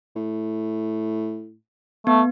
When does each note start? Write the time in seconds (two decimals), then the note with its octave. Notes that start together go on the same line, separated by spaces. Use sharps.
0.16 A2
2.07 A3 B3